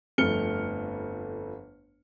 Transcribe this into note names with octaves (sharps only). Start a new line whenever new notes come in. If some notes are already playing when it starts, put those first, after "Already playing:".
G1 F2 A3 F6 C#7 G7